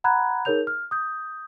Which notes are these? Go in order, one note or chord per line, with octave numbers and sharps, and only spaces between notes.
F#5 A#5 B5 F#6 G#6
D#4 G#4 A#4 C#5 G6 F7
F6
D#6 G6